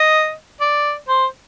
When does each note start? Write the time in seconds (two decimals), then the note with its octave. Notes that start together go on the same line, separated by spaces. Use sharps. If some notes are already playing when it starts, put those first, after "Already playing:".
Already playing: D#5
0.61 D5
1.08 C5